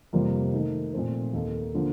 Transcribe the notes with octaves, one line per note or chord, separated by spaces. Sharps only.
F2 C3 G3 A#3 F4
D#3 A3 D#4 A#4
A#2 F3 A3 C4
D#2 D#3 A#3 D#4 A4
D3 F3 A#3